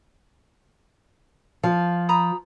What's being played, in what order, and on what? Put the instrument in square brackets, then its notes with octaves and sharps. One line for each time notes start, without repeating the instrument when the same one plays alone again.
[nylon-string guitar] F3 [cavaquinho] F5
[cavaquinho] A#5 B5 D#6